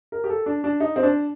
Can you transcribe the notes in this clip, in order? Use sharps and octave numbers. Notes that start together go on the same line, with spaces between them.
A#4
G4
A4
D4
D4
D#4
C4
D4